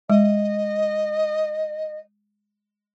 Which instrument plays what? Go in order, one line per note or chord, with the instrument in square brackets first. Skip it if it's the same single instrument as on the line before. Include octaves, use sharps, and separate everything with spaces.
[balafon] G#3 [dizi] D#5